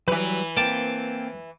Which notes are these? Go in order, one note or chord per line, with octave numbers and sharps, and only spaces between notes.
E3 F#3 G3 B4
A#3 C4 G5 A5 D6